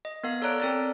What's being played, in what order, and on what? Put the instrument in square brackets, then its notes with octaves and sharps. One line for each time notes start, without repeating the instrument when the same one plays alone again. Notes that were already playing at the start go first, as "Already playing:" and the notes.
[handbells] D#5
B3 A#4 F5
A4 C#5 D5 A#5 F#6 D7
C4 A4 A#4 D5 A#5 A6